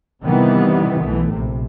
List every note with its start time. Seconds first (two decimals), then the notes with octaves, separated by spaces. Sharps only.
0.24 C3 D#3 E3 G3 B3
1.00 B1 E3 A3
1.33 A#1 C3